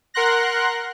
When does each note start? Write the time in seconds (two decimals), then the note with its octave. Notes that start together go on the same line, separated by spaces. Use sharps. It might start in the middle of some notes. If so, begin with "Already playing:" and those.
0.14 A#4 F#5 C6 F#6 A#6